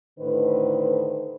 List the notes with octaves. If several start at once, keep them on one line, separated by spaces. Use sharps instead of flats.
A2 D3 D#3 B4 C5